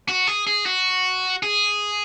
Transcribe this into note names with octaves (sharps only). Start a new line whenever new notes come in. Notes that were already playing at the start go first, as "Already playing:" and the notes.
F#4
G#4
G#4
F#4
G#4